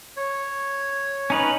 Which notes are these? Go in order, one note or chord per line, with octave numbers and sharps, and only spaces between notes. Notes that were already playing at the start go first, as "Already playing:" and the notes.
C#5
C#4 D#4 B4